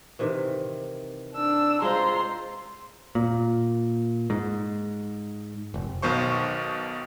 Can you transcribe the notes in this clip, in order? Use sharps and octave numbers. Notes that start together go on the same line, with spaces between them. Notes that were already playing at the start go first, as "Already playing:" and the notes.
C3 D#3 E3
D4 E6
G#3 F4 C5 A#5 C6
A#2
G#2
F1
B1 B2 D#3 C5 C#6